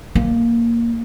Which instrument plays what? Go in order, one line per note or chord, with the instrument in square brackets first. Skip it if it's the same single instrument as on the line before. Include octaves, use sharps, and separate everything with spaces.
[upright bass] A#3